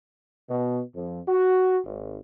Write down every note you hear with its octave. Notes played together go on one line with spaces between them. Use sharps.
B2
F2
F#4
G#1